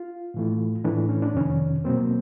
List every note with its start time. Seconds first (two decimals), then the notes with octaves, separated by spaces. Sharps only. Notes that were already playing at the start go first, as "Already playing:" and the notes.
Already playing: F4
0.34 A2 E3 A3
0.84 A2 E3 A3 D4
1.09 C#4
1.22 D4
1.34 F2 C3 D#3 C#4
1.84 B2 F#3 A#3 C4